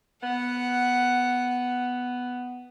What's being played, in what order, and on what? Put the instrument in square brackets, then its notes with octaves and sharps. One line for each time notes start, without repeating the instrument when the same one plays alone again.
[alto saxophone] B3 [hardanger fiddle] F#5